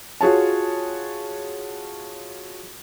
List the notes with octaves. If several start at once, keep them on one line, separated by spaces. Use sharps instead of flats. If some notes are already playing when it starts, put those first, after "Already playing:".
F4 F#4 G#4 C#5 A5